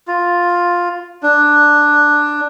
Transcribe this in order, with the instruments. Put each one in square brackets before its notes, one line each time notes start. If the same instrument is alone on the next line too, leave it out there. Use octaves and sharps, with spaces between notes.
[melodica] F4
D4